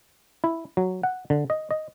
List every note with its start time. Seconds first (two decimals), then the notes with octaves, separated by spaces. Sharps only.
0.44 E4
0.77 F#3
1.03 F#5
1.30 D3
1.50 D#5
1.71 D#5